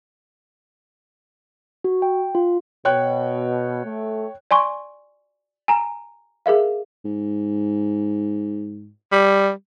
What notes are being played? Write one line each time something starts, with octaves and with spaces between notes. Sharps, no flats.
F#4
G5
F4
B2 C#5 G5 F#6
A3
D5 G#5 C6 C#6
G#5 A#5
G#4 A#4 E5 F5
G#2
G3